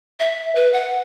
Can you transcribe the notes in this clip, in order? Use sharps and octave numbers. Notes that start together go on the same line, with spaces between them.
E5
B4
F#5